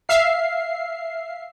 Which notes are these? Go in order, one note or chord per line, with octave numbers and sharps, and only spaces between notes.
E5 F5 C7